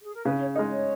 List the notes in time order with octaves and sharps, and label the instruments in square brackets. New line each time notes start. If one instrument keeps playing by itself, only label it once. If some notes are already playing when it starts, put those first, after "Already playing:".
[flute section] G#4
A#4
[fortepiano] C#3 [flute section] B4
[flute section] C#5
[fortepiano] G#3 D#4 [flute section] A#4
[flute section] C#5